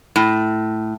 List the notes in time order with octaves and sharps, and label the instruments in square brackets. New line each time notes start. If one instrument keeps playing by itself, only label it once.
[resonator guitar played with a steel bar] A2